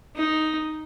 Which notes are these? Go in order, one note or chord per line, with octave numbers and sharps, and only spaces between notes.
D#4